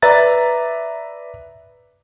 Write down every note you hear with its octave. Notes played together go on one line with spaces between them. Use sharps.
B4 D5 E5 A#5 A6